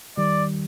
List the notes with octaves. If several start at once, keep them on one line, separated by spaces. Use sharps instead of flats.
D#3 G3 D5